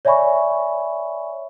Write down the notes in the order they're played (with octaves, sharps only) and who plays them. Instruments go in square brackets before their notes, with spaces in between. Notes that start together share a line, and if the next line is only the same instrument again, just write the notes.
[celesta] C#5 D5 E5 G#5 B5 C#6